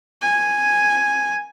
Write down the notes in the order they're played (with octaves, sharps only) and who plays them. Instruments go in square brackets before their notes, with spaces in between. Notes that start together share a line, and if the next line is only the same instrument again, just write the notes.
[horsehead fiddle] G#5